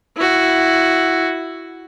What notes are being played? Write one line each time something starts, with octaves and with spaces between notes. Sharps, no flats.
E4 F#4